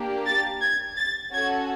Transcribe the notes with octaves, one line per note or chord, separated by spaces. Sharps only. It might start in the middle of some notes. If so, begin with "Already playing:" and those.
Already playing: A#3 D4 G4
A6
G#6
A6
C#4 F#4 A4 G#6